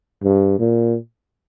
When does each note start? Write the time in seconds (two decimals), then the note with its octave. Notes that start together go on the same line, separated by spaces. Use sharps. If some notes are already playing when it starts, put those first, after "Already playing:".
0.24 G2
0.59 A#2